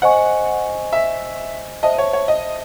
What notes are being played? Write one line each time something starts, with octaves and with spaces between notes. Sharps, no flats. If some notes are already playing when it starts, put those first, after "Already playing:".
C5 D#5 F#5 G#5 C#6
E5
C5 D#5 E5 A5
C#5
C#5
D#5